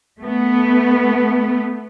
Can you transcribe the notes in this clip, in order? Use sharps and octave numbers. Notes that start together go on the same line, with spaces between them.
A3 B3